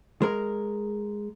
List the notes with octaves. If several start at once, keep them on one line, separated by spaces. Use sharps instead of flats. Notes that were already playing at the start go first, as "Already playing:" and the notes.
G#3 A#4